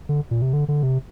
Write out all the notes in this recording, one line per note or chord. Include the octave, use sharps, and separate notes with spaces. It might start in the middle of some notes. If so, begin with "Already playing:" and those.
D3
A#2
C3
D3
D3
C3